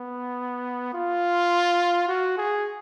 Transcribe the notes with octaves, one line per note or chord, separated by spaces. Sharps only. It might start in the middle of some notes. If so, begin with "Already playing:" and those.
Already playing: B3
F4
F#4
G#4